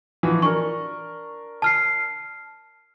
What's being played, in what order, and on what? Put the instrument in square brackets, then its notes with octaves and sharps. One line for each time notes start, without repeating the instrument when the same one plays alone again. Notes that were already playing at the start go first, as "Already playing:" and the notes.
[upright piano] E3 F3 F#4
[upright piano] D4 A#4 [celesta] C#6
[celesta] A5 F6 C7